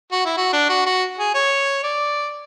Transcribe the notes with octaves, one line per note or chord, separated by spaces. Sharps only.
F#4
E4
F#4
D4
F#4
F#4
G#4
C#5
D5